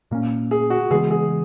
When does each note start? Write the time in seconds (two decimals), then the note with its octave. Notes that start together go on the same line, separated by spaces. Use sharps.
0.11 A#2 A#3 C#4
0.51 G#4
0.70 F#4
0.90 C#3 E3 G#3 B3 G#4
1.11 G#4